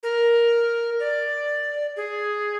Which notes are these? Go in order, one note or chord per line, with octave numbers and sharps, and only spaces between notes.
A#4
D5
G#4